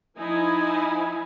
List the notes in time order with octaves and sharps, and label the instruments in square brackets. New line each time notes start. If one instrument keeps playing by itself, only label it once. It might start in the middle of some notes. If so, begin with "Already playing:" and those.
[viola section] F3 D#4 E4 G#5